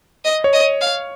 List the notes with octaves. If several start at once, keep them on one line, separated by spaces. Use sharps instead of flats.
D#5
C#5
D#5
F5